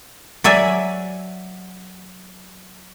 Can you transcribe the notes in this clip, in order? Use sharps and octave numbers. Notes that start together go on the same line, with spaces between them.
F#3 D5 E5 G#5